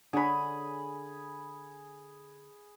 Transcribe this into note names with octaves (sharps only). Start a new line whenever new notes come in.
D3 G#4 C#5 B5